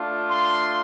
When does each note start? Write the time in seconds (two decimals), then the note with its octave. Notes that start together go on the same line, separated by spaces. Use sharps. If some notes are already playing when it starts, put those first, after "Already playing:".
Already playing: A3 D4 F4
0.29 C6